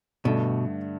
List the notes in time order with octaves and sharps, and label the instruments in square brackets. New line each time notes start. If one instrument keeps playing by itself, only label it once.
[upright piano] G2 D3 A3 D4 [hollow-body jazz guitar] B2